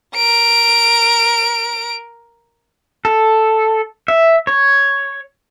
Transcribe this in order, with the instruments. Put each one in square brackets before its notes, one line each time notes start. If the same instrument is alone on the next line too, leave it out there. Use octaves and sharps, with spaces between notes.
[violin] A#4 D7
[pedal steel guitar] A4
E5
C#5